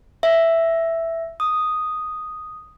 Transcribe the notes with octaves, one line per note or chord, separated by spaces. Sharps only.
E5
D#6